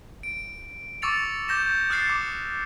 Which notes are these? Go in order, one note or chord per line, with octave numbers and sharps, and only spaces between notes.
D7
C#6 D6 E6 A6 C#7 F7
D6 G6 A#6 E7
D#6 F6 F#6 A6 C7 C#7
D6